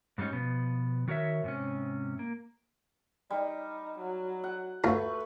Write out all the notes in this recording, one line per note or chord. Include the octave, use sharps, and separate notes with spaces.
G#2 G3 A3 C#4 D#4
B2 F3 B3
D#3 F#4 A#4 C#5 E5
G#2 C3 C#4
A#3
G3 D#4
F#3
F#5
D2 A3 F4 B4 A#5 C#6